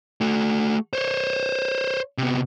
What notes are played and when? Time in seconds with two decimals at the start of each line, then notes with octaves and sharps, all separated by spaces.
0.21 A3 F#4
0.93 C5 C#5
2.18 C3 B3